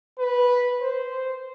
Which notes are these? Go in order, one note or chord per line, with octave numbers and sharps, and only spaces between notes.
B4
C5